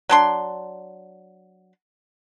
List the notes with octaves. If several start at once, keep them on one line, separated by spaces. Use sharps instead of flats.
F#3 D4 C6